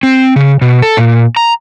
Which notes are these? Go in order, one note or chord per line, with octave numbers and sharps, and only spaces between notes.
C4
C#3
B2
A4
A#2
A#5